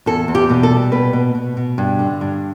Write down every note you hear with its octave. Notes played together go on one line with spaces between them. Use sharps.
E2 A4
E2
G4
B2
A4
G3
B2 B4
B2
B2
B2
G2
D3
G2